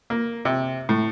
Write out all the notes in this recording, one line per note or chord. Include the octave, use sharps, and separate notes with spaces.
A#3
C3
A2